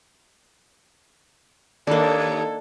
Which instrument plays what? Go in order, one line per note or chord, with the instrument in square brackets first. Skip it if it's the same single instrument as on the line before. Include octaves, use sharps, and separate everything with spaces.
[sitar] D#2 [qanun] A#3 D4 [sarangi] A4